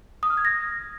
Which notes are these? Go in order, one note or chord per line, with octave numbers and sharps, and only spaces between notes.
D#6
F6
G#6
A#6